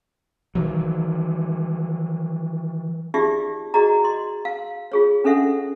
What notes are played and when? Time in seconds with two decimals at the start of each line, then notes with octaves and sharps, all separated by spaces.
0.55 D#3 E3 F#3
3.14 D#4 F4 G4 G#4 D5 E5
3.74 F#4 G#4 D5 D#5 A#5
4.04 D#5 C6
4.45 F5
4.92 F4 G#4 C#5
5.24 C#4 D4 A4 E5 F#5